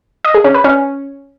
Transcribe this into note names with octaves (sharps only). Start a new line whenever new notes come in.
D#5
G#4
C#4
B4
C#4